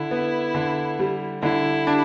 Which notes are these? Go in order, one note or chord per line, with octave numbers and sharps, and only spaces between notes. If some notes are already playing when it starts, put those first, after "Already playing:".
Already playing: D3 E4
B3
D3
G3
D3 E4
D4